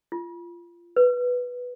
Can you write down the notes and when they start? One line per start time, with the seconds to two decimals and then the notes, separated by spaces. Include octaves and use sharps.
0.12 F4
0.96 B4